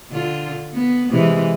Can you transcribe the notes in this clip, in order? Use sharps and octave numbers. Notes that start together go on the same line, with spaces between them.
D3 F4
B3
C3 E3 G#3